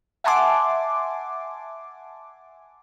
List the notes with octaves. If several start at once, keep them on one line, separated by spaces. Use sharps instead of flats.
E5 F#5 G#5 A5 C6 D6